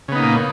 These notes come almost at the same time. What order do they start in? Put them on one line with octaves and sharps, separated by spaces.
C#3 B3 D#4 A#3 A#2